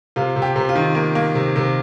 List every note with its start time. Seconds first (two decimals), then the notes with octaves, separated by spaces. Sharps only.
0.16 C3 F4
0.36 C3
0.42 G4
0.56 C3
0.69 F4
0.75 D#3
0.95 A#3
1.15 A#3
1.35 C3
1.56 C3